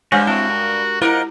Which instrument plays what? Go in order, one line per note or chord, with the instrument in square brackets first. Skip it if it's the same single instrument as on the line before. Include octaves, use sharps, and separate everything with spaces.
[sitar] G2 [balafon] G#3 C#5 G#5 [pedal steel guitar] F#4 C5 F6
[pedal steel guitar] C4 E4 [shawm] F#4 [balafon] A5
[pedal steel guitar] A#4
[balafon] E4 [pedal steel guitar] F4 C5 D#5 [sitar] A#4 [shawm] F#5